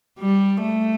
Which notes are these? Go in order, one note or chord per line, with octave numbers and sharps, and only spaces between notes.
G3
A3